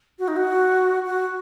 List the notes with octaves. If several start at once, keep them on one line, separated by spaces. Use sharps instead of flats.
F#4
D#4
F#4
F#4